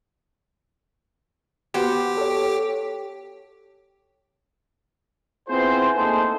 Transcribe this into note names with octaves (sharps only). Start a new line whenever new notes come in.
B3 F#4 G4 C5
A4 C#5
B3 C4 E4 F4 G#4 C5
A3 A#3 D#4 G#4 A4 C5